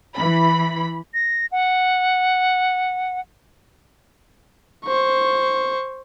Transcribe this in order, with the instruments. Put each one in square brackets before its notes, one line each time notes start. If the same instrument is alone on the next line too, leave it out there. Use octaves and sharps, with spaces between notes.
[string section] E3 B5
[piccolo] A#6
F#5
[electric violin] C5 C#6